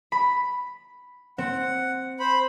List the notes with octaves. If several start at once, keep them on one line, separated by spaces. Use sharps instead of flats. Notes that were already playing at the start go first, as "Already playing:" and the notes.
B5
C4 F#5
C5 B5